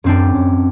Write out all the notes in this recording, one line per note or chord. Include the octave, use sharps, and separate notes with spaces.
F#2 C4 D4
F#2